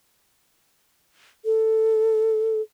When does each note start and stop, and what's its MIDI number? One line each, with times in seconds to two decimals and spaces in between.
1.45 2.61 69